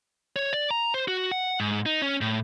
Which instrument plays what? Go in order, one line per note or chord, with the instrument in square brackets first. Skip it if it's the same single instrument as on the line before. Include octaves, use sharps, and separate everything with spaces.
[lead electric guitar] C#5
D5
A#5
C5
F#4
F#5
G#2
D#4
C#4
A2